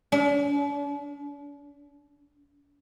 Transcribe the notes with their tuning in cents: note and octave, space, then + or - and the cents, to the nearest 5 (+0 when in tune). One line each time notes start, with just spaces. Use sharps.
D4 -45